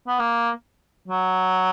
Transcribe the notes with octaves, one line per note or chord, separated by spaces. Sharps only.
B3
A#3
F#3